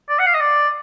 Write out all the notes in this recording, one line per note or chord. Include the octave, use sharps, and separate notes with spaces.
D5
F#5
F5
D#5
D5